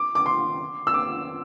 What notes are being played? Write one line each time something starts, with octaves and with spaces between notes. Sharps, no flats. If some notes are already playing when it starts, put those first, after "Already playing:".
Already playing: D6
D6
C6
E6
D6